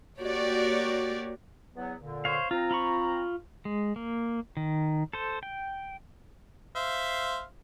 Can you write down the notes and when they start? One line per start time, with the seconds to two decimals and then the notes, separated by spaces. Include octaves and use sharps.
0.20 A#3 F#4 G4 C#5 D5
1.75 E2 F#3 B3
2.01 A#2 D3
2.25 C5 C#5 F5
2.51 C4 F4 A#5
2.71 F4 B5 C#6
3.65 G#3
3.96 A#3
4.57 D#3
5.13 A4 C5
5.43 G5
6.76 C5 E5 F5